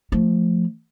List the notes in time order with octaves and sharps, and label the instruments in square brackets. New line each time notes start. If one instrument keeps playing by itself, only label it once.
[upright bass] F3 A3